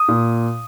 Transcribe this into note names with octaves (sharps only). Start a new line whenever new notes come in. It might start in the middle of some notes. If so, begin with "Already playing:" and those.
Already playing: D#6
A#2